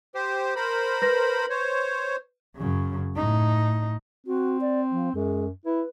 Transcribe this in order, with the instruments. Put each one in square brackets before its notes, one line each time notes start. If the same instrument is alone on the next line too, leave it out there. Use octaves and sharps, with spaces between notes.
[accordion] G4 C5
A#4 C5 B5
[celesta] B4 A#6
[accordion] C5 C#5
[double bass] F#2 C#3
A2 D#4
[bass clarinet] C4 [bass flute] F#4
[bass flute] D5
F3
[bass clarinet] F#2 [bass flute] G#3
[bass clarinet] E4 [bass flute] B4